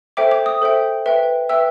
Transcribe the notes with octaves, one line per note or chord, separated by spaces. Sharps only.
A4 C5 E5 G5 D6
D6
D#6
A4 C5 E5 G5
B4 E5 G5
B4 E5 G5 E6